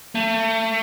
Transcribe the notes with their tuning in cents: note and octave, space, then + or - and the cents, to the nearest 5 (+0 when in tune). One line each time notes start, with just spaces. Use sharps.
A3 +30